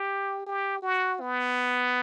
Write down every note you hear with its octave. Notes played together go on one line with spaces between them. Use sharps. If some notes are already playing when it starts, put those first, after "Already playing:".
Already playing: G4
G4
F#4
B3